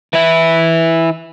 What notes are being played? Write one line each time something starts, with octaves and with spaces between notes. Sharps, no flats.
E3 E4